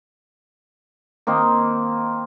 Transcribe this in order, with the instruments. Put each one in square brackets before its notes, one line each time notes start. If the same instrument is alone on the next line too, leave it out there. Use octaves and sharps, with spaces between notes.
[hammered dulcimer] D#3 A#3 C4 C6